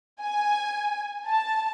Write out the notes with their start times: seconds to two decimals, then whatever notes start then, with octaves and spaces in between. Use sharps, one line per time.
0.21 G#5
1.26 A5